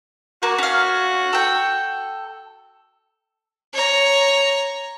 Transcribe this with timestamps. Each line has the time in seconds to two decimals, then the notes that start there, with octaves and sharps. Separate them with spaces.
0.43 A#3 F#4
0.58 C#4 F5
1.33 A4 G5
3.74 C#5 A#5